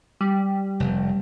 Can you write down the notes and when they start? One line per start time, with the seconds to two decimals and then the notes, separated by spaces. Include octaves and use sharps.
0.21 G3
0.80 F1